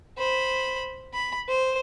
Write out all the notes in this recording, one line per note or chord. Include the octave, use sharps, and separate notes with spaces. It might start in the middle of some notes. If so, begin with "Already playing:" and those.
C5 B5
B5
C5